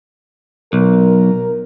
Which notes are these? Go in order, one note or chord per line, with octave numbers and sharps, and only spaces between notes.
B1 A#4